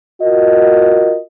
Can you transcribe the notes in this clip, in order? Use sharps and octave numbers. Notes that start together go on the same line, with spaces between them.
F4 F#4 A#4 D#5